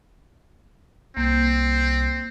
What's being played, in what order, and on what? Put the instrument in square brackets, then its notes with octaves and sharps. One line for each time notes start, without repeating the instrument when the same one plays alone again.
[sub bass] C2 [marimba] A#3 [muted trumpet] C4